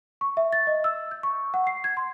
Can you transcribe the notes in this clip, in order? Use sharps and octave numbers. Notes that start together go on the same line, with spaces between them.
C#6
E5
A6
D#5
E6
G6
C#6
F#5
C7
G#6
C6